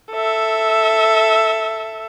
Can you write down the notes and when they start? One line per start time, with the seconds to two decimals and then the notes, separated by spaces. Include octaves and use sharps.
0.12 A4 E5